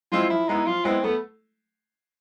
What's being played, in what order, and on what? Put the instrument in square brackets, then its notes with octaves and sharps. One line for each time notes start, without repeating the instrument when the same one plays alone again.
[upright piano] F3 G#3 C4 E4 [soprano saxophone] F4
[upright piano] F3 [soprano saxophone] E4
[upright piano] G#3 B3 E4 [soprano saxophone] D#4
[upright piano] F3 [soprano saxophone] F4
[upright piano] G#3 B3 E4 [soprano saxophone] C4
[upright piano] A3 [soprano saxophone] B3